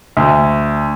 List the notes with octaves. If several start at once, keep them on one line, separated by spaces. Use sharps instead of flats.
D2